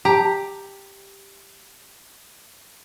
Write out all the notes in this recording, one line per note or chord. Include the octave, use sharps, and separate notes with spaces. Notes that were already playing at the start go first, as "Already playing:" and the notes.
G4 A#5